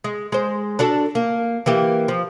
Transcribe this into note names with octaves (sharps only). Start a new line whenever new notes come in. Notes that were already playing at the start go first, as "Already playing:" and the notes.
G#3
G#3 C5
D4 F#4 A4
A#3
E3 A#3 G4
F3